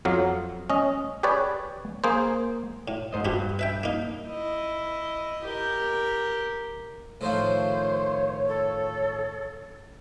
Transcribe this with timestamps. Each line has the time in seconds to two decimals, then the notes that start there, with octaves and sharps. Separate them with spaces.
0.05 F2 F#3 F5
0.70 C#4 D#5
1.23 G4 G#4 B4 C#5 D5
2.04 A#3 G#4 C5
2.88 A2
3.13 G#2 C5 D#5
3.25 G2 B3 F#4 G4
3.59 B4 E5 G5
3.83 A#3 D#4
4.28 E4 D#5
5.44 G4 A#4
7.21 A2 D#3 F3 C5 C#5
8.48 A4